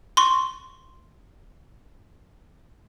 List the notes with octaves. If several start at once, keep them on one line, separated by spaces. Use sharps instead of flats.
C6 C#6